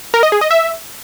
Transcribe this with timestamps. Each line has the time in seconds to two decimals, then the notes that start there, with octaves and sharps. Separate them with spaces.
0.14 A#4
0.23 D#5
0.32 G#4
0.41 D#5
0.51 E5